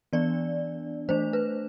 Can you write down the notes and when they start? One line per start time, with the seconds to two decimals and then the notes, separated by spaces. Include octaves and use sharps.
0.13 E3 B3 D4 D5
1.09 E3 A3 D4 C5
1.33 B4